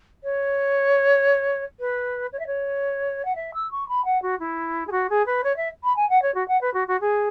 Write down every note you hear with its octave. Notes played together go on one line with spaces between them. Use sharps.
C#5
B4
C#5
E5
C#5
F#5
E5
E6
C#6
B5
F#5
F#4
E4
G#4
F#4
G#4
B4
C#5
E5
B5
G#5
F#5
C#5
F#4
F#5
B4
F#4
F#4
G#4